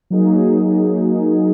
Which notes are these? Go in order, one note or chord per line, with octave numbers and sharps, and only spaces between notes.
F#3 A#3 D#4 G#4